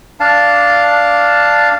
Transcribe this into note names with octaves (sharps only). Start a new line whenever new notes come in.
D4 F5 A5